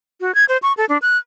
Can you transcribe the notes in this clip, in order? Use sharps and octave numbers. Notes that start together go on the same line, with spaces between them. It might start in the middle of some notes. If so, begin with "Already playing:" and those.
F#4
G#6
C5
C#6
A4
D4
F#6